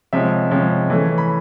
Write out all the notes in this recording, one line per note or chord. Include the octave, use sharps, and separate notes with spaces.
C3 F3 G#3 C#4 E5
C3 F3 G#3 C#4
E3 A3 C#4
B5